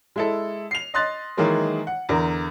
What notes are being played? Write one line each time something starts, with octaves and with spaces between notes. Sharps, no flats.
G#3 E4 A4
C7 F7
D#5 C6 F#6 A6
D#3 E3 F#3 G#3 A#3
F#5
E2 D3 A#4